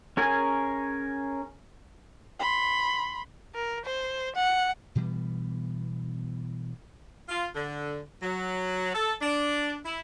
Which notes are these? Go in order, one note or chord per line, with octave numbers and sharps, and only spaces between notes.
C#4 G#4 A#4 G#5
B5 C6
A#4
C5
F#5
B2 E3 G3 B3
F4
D3
F#3
A4
D4
E4